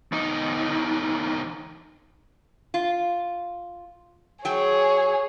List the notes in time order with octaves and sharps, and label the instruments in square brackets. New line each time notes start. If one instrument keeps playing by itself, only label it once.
[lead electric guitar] E2 D#4
[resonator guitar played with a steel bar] F4
[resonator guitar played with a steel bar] F#3 G5 [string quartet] G#4 C#5